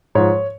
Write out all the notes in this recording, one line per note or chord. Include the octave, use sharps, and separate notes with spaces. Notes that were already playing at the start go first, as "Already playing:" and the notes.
G#2 F3 C#5